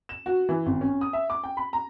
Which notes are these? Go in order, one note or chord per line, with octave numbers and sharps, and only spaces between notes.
E7
F#4
E3
G#1
C#4
D#6
E5
D6
G5
B5
A#5